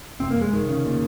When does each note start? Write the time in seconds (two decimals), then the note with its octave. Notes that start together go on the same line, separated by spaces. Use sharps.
0.20 F1 C4
0.30 A#3
0.36 F1
0.41 G#3
0.52 F1 D#3
0.69 C#3
0.85 A#2